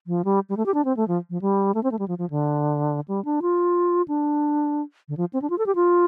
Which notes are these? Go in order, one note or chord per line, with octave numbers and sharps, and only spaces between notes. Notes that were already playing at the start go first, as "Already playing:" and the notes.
F3
G3
G3
A3
G4
D4
C4
A3
F3
F3
G3
A3
C4
A3
G3
F3
F3
D3
G3
D4
F4
D4
D3
F3
C4
D4
F4
A4
G4
F4